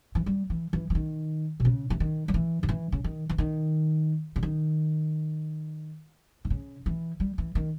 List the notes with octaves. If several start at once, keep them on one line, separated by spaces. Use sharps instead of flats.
E3
G3
E3
E3
E3
D#3
B2
C#3
E3
D#3
G3
E3
D#3
E3
C#3
D#3
E3
D#3
C#3
D#3
D#3
C#3
E3
G3
E3
D#3